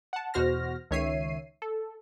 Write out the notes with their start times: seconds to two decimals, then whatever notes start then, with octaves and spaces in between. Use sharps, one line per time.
0.13 F#5 A5
0.34 E2 B2 F#4 C5 F6 A#6
0.91 C#2 D#3 C#5 E5 C7 D#7
1.62 A4